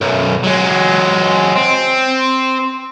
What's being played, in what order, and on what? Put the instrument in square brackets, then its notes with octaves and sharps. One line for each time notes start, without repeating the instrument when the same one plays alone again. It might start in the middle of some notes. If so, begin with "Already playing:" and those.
[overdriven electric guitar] B1 F#2
F#3 G#3
C4